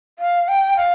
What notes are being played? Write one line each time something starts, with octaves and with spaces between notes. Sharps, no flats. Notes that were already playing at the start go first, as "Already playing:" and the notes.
F5
G5
F5